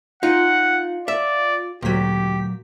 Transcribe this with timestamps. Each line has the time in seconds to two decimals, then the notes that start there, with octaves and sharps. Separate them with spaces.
0.23 D#4 F4 F#5
1.08 D5 E5
1.82 D2 A#2 F#3 G4 B6